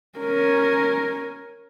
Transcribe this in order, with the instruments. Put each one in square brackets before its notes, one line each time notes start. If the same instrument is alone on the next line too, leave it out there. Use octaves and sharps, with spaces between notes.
[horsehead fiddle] C#4 A#4